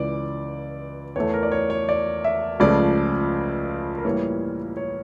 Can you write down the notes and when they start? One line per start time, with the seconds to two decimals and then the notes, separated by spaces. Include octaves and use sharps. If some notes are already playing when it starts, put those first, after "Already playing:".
Already playing: C#2 C#3 E3 D5
1.16 E2 E3 A3 C#5
1.34 A#4
1.43 D5
1.52 C#5
1.70 C#5
1.89 D5
2.24 E5
2.60 C#2 C#3 F3 A3 D5
3.98 A#4
4.05 A2 E3 G3 A#3 C#5
4.77 C#5